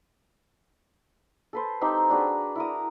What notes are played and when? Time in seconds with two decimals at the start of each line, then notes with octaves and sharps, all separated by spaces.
1.53 A4 B4 C5
1.81 C4 D#4 G4 C5
2.10 D4 F#4 G#4 B4
2.56 E4 A#4 D#6